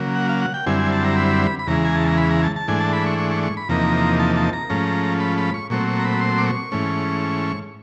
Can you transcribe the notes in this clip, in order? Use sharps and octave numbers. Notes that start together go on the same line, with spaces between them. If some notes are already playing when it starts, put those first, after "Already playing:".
Already playing: C#3 F#3 A#3
F#5
F5
F#5
G5
F#2 D3 G3 C4 E4 G#5
G#5
A5
A#5
B5
B5
E2 C#3 E3 G#3 A#5
G#5
A5
A#5
B5
A#5
A5
A5
G#2 E3 A3 D4 G#5
A5
B5
C#6
C#6
C#6
C#6
B5
E2 C3 F3 A#3 D#4 A#5
A5
A5
A#5
G#2 F3 A3 C#4
B5
B5
C#6
A#2 F#3 A3 C4 C#6
C#6
A#5
B5
C6
D6
C#6
G#2 E3 A3 C#4